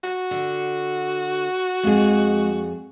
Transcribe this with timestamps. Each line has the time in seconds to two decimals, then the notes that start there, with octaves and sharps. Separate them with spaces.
0.03 F#4
0.31 D3
1.83 F2 G#3 G#4